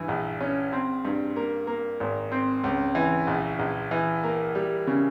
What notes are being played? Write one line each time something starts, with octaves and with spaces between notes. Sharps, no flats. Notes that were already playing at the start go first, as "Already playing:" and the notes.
Already playing: G2 E3
A#1
C#4
C4
G2
A#3
A#3
G#1
C4
C#2
E3
A#1
A#1
E3
A#3
G3
C#3